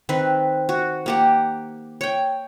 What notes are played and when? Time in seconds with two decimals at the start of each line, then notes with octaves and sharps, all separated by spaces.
0.09 D#3 C4 B4
0.69 F#4
1.06 A#3 G4 F#5
2.01 C#5 G5